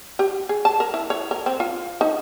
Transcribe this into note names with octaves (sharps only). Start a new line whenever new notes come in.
G4
G#4
A5
A#4
E4
C#5
A#4
C4
F4
D#4